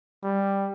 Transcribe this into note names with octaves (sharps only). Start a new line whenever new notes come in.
G3